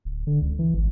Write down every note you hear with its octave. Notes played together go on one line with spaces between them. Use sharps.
D1
D3
C#2
E3
G#1